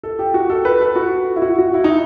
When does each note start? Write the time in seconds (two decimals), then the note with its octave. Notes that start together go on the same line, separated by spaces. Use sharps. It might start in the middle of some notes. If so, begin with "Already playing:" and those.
0.03 A4
0.19 G4
0.34 F#4
0.50 A4
0.65 B4
0.81 A4
0.96 F#4
1.36 E4
1.42 F#4
1.59 F#4
1.74 E4
1.84 D#4